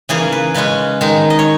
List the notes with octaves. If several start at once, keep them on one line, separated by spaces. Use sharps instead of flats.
C#3 E3 A#3 G#4
B4
C#3 G#3 C#4 B4
D#3 G#3 D#4
D#5
C#5